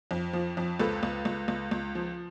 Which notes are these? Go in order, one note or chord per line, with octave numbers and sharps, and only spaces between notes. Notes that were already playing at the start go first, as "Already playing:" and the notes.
F2
F3
F2
C#2 A4 B4
C#2
C#2
C#2
C#2
F3